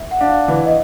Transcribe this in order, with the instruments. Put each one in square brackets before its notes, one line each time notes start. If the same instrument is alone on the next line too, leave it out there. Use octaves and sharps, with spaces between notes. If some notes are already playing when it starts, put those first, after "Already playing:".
Already playing: [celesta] E5
F#5
[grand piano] D4 [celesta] F5
[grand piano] E3
[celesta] D#5